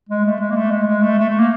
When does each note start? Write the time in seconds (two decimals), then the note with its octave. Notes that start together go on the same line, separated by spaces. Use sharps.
0.09 G#3
0.25 A3
0.40 G#3
0.50 A#3
0.56 A3
0.71 G#3
0.87 G#3
1.02 A3
1.19 A3
1.29 A3
1.39 A#3